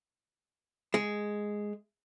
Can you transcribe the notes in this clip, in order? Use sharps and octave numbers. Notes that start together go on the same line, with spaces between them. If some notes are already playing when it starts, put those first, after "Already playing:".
G#3